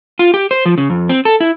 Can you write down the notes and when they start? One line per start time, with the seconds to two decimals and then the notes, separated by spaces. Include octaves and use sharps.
0.19 F4
0.34 G4
0.51 C5
0.65 F3
0.78 C#3
0.90 F2
1.09 C4
1.25 A4
1.40 E4